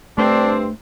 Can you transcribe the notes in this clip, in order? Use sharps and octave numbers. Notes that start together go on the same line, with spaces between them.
G2 A3 C4 D4